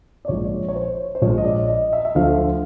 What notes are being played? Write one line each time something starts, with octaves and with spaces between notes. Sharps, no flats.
D5
A#1 A#2 F3 G#3 C#5
C#5
C5
C5
A#1 A#2 F3 G#3 C#5
D#5
D5
D#5
E5
E5
D2 D3 F3 A3 F5